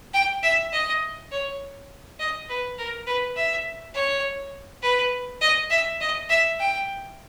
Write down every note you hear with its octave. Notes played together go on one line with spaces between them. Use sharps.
G5
E5
D#5
C#5
D#5
B4
A#4
B4
E5
C#5
B4
D#5
E5
D#5
E5
G5